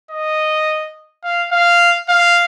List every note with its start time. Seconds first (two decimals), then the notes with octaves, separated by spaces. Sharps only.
0.11 D#5
1.24 F5
1.52 F5
2.09 F5